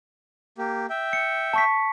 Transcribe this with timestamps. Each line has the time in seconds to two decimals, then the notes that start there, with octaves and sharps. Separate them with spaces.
0.58 A#3 G4
0.90 E5 G5
1.13 C#7
1.53 A5 C#6 B6